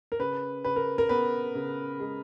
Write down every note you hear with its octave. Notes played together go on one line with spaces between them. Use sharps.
A#4
C#3 B4
C#3 B4
A#4
A#4
B3 B4
C#3
G#3